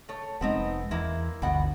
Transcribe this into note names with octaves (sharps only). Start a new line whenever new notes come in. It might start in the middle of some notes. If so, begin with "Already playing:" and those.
A3 C#5
F1 G#3 B3 C4 D#4
E2 G#3 A#3 E4
G1 D2 B2 F#5